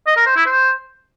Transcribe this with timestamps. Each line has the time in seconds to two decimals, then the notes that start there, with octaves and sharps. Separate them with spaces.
0.07 D#5
0.17 A#4
0.26 C5
0.36 E4
0.46 C5